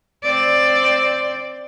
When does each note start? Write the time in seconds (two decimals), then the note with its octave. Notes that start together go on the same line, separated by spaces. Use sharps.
0.23 C4 D5